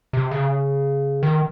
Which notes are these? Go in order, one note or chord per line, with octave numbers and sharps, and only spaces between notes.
C3
C#3
D#3